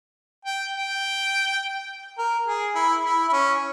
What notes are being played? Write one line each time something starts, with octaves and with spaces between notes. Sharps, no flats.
G5
G5
A#4
G#4
E4
E4
E4
C#4